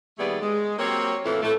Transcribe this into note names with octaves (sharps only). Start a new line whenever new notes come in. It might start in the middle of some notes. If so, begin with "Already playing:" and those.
D#2 G3 A3 B3 G#4 D5
G#3
F#3 A#3 C4 G4 C#5
F2 A2 E3 F3 A3 A#3
A2 A3